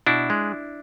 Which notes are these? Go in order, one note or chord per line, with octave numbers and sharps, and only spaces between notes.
B2 D4 E4
G#3